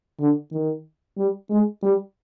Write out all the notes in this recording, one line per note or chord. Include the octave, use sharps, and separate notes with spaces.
D3
D#3
G3
G#3
G3